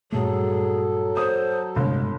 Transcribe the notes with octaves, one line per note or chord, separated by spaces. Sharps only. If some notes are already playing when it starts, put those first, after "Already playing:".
G2 A#2 F#3 A3 G#4 A4
C5 D#6
G1 A2 C3 G#3